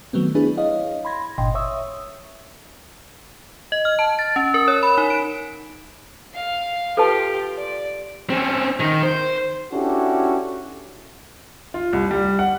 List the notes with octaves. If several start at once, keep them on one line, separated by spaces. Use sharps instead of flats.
D#3 F#3 A3 B3 C4
B3 D4 E4 G#4 B4
E4 C#5 D#5 F5
B5 C6 G#6 A#6
G1 A#2 D#5 G5 C6
C#5 E5 C#6 D#6 E6
D#5
F6
A5
A6
C#4
A#4
C#5
B5
D#4
D7
F5
F4 G4 A4 B4 A5
D5
C4 C#4
D#3
C5
C#4 D4 E4 F#4 G4 A4
F4
C2
G3
F#5